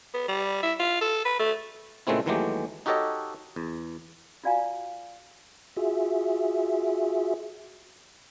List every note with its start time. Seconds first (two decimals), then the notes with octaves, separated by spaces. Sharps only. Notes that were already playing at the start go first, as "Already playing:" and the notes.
0.14 B3
0.28 G3
0.63 E4
0.79 F4
1.01 A4
1.25 B4
1.40 A3
2.07 A#2 C#3 G#3 A3 C4 E4
2.26 D#2 E3 F#3 G#3 A3 G4
2.86 D#4 F#4 G4 A4 C#5 D#5
3.56 E2
4.44 F4 F#4 D5 F5 G#5 A#5
5.77 F4 F#4 G#4 E5